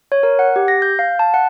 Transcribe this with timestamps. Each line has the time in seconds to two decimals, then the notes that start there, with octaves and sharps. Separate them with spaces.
0.12 C#5
0.23 A#4
0.39 F#5
0.56 G4
0.68 A#6
0.82 G6
0.99 F5
1.19 A5
1.34 F#5